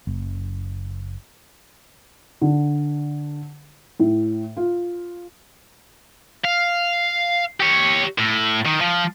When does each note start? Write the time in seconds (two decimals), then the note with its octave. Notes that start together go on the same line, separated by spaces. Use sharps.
0.07 F#1
2.41 D3
4.00 A2
4.57 F4
6.44 F5
7.60 G4 C#5
8.19 A2
8.66 D#3
8.81 F3